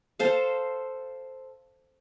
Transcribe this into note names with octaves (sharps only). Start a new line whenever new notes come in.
A4 C5 F5